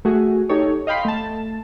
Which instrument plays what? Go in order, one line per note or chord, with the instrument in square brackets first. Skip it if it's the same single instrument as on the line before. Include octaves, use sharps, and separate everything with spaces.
[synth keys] A3 F#4 G#4
D#4 G4 A4 C#5
D#5 F5 G5 B5 C6
A3 A5